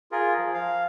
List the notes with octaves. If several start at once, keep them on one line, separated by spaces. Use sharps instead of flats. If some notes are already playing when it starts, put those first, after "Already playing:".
F4 G#4 A#4
F3
F5